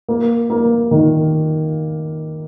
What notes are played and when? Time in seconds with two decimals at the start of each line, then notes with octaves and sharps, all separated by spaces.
0.09 A#3
0.50 A#3
0.91 D#3